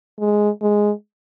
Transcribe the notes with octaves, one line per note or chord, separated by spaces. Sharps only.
G#3
G#3